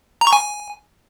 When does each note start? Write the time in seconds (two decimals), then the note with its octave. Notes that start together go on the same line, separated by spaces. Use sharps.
0.21 A#5
0.27 C#6
0.33 G#5